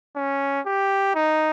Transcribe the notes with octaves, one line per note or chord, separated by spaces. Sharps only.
C#4
G4
D#4